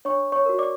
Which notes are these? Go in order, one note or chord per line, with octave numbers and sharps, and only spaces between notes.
D4 C#5 C#6
C#5 C#6
F#4 A#4
D5 D6